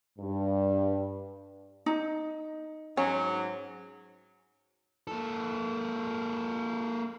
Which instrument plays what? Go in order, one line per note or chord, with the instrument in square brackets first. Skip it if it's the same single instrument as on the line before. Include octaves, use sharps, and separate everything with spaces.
[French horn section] G2
[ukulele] D#4
[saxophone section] G#2 F#3 [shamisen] C#4
[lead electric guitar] A#3 A4